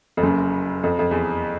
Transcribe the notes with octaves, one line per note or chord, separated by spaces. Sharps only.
F2
F#1 F#2
F2
F2
E2